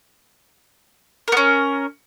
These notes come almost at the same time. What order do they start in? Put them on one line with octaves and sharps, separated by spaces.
A#4 B3 C#4